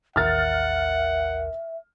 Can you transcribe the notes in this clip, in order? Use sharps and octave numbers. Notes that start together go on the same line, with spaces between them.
A1 D#2 A#4 E5 F#5 F6 A6